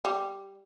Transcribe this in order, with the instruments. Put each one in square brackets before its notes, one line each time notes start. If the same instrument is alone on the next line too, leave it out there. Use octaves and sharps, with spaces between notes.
[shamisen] G3